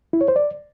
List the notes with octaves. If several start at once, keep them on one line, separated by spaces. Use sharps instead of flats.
E4
C#5
C5
D5